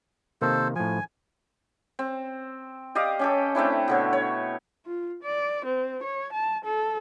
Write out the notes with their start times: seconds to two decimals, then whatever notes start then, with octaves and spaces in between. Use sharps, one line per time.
0.42 C3 D#3 A#3 A4 C5
0.76 A2 F3 G#5
1.99 C4
2.95 G4 D5 D#5 F5
3.19 C#4 G4 A4
3.55 A3 C4 D4 E4
3.88 B2 D3 C#5
4.13 C#5
4.86 F4
5.23 D5
5.65 C4
6.03 C#5
6.33 A5
6.64 A4